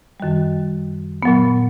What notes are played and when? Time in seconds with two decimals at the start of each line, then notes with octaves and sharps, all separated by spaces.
0.20 F#2 D#3 G3
1.23 A#2 F#3 B3